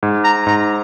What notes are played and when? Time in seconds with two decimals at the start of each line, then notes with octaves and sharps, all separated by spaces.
0.03 G#2
0.24 A#5
0.47 G#2 A#5